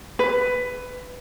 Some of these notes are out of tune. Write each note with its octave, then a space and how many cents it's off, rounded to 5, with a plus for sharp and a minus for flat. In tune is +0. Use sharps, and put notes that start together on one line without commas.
B4 +15